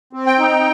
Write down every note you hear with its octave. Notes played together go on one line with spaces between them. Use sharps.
C4
G5
D#4